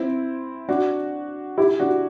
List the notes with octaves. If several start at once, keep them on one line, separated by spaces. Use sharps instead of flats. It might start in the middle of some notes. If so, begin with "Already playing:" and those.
Already playing: C4 E4
D4 F#4
E4 G4
D4 F#4